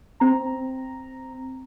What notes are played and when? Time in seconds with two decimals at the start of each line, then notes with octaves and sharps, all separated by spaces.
0.20 C4 A#5